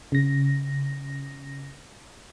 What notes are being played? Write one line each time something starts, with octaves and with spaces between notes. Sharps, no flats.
C#3 A#6